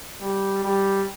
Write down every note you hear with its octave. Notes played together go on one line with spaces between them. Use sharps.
G3
G3